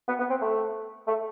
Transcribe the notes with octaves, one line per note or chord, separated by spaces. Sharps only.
B3
B3
C4
A3
A3